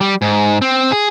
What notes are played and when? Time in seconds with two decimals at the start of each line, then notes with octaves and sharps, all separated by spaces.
0.01 G3
0.22 G#2
0.62 C4
0.92 G#4